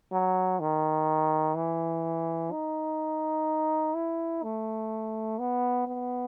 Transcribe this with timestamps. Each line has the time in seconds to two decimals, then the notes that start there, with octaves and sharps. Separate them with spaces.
0.12 F#3
0.60 D#3
1.55 E3
2.52 D#4
3.95 E4
4.43 A3
5.39 B3
5.87 B3